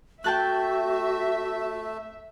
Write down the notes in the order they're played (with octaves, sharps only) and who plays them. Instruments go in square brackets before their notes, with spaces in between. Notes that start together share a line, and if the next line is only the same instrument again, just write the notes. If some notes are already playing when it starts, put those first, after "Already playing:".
[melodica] A3 [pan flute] F#4 [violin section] E5 [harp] G5 A5 F#6